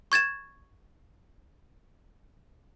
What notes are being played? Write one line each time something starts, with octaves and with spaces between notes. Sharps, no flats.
C#6 G#6 A6 E7